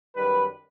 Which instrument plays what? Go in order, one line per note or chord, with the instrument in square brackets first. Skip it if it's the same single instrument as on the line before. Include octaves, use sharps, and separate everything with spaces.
[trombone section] F#2 D#3 G3 B4